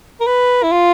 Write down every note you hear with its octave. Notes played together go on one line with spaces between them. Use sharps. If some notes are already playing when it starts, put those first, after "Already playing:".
A#4
B4
E4
F4